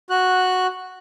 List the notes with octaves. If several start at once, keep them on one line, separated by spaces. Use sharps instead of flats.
F#4 F#6